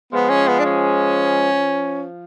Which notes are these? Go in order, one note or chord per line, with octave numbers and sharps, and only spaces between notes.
F3 G#3 B3
C#4
B3
D4
C#4
F3